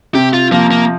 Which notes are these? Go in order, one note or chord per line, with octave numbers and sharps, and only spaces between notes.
C3 G4
F4
F3 A#3
A#3